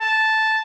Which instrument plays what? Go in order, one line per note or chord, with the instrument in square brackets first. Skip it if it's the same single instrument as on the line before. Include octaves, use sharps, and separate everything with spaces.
[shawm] A5